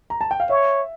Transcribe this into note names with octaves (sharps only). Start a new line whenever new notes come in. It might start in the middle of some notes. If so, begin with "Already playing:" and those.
A#5
A5
G5
F5
C#5 E5